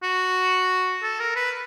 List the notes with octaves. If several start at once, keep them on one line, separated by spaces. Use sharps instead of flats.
F#4
A4
A#4
B4